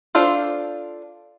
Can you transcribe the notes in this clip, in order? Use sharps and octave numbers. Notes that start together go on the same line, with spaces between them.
D4 F4 A4 C5